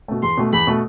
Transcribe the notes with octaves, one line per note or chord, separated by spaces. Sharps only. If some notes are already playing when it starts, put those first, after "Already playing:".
B2 A3
E2 C6
B2 A3
E2 B5
B2 A3